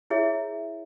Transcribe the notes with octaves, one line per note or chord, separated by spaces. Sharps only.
E4 G#4 A#4 C#5 E5